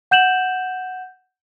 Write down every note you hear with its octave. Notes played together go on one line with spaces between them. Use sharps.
F#5 G6 E7 F#7